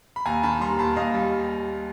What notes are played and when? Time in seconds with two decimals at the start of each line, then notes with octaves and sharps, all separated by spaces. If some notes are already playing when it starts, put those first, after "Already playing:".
0.16 B5
0.26 D#2 G#5 A#5
0.43 D#3 A5 B5
0.61 G3 A#5 C6
0.79 D#2 A5 B5
0.96 D#2 D#5 F5
1.14 G3